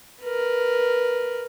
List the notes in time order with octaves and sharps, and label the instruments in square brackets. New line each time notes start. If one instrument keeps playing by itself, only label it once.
[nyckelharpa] A#4 B4